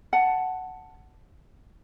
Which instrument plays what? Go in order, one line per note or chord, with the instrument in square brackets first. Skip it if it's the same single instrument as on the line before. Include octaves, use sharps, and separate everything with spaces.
[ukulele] F#5 A5